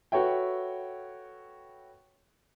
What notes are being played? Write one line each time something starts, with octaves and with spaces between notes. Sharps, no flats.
F#4 A4 B4 C#5 E5 G5